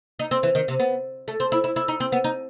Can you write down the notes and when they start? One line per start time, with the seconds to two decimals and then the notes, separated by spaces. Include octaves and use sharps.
0.19 D#4
0.31 C4
0.43 E3
0.55 D#3
0.68 C3
0.79 B3
1.28 A3
1.40 C4
1.52 E4
1.64 E4
1.76 E4
1.88 D#4
2.00 C4
2.12 B3
2.24 D#4